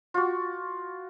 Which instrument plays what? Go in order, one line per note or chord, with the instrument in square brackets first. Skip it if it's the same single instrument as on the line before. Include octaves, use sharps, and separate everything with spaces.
[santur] F4 F#4